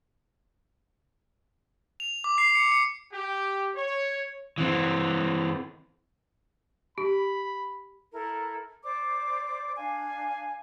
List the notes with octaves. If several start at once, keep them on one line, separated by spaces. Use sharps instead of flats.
F7
D6
C7
C#7
C#7
G4
C#5
E3 C4
G4 B5
E4 A4 A#4
C5 D5 D6
D4 F5 G#5